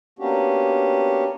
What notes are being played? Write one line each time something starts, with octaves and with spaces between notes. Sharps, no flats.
A#3 B3 C#4 D4 F#4 G4